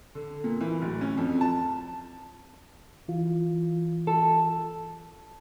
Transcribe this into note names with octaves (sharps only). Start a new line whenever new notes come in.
D3
A#2
E3
D1
C#4
F2
A5
E3 F4
A4